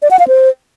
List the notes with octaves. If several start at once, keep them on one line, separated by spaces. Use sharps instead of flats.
D5
F#5
F5
C5